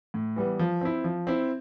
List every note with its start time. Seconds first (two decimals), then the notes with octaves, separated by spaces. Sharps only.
0.14 A2
0.36 E3 G3 B3
0.59 F3
0.81 C4 E4
1.04 F3
1.27 C4 E4